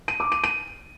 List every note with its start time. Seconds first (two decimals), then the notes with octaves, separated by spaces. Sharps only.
0.08 D#7
0.20 D6
0.32 D#7
0.44 D#7